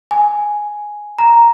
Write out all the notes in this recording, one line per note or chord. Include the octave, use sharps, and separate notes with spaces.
G#5
A#5